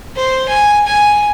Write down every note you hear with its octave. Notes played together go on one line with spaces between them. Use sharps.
C5
G#5
G#5